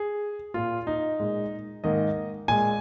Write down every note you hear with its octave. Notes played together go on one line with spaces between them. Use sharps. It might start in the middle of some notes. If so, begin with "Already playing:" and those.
Already playing: G#4
A#2 A#3 F4
D#4
A#2 G#3
G#2 D#3 A#3 D#5
A#2 G#3 G#5